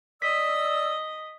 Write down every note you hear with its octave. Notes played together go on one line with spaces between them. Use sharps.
D5 D#5 E6 B6